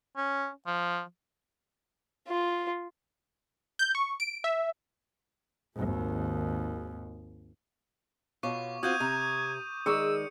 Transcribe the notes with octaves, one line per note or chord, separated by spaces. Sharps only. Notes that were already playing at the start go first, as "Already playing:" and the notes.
C#4
F3
F4
G6
C#6
D7
E5
G#1 D#2
B2 F4 C#5 C#6 D6
C4 F4 F#4 D#6 G6 G#6 D#7
C3 A#5
D#3 G#3 G#4 D5 C#6 E6 C#7